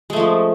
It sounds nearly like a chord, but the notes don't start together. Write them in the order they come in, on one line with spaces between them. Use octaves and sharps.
G#3 A3 F3 C#4